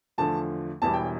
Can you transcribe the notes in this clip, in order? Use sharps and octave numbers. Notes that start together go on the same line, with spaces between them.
E2 D3 F3 A3 A5
E1 E2 E3 G3 A5
G5